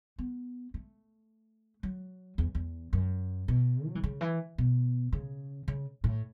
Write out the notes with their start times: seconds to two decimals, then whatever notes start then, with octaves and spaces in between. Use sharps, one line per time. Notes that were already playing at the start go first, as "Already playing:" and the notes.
0.19 B3
0.74 A3
1.83 F#3
2.38 E2
2.55 E2
2.93 F#2
3.48 B2
3.87 F#3
3.95 E3
4.04 C#3
4.21 E3
4.58 B2
5.13 C#3
5.68 C#3
6.04 A2